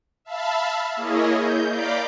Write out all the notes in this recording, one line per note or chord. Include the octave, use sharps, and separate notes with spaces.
E5 F5 A5 B5
A#3 E4 G#4 C#5 D#5
G6
D5 F5 A#5 B5 D6 G6